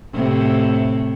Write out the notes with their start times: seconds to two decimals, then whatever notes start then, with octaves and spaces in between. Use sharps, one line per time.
0.13 A2 C3